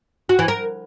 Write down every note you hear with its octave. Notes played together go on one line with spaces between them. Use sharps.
F#4
E3
A#4